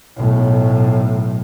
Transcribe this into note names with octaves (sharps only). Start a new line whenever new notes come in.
B1 A2